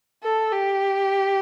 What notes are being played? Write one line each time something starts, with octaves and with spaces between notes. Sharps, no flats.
A4
G4